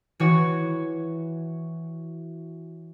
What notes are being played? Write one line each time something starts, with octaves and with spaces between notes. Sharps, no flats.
E3 F#4 C#5